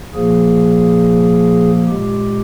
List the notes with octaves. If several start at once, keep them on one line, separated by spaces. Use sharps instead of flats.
A#2 F3 A#3 G#4
A#2 G#3 G4